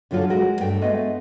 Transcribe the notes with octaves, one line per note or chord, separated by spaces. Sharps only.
F#2 D3 F3 F#3 F4 A4
G#3 F#4 A#4
G2 A3 G5
G#3 A3 B3 D#5